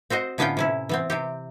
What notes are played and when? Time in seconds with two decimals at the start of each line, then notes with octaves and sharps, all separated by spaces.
0.10 C4 F#4 C5 D#5
0.38 A2 D3 B3 C#4 F4 G5
0.57 C3 C#4 E4
0.89 E3 B3 C4
1.10 C3 C4 G4